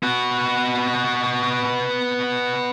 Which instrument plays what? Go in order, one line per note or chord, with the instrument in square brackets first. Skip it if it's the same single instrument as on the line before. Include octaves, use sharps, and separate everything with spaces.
[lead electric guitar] B3 F#4